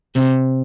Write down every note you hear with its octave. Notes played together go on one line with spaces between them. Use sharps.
C3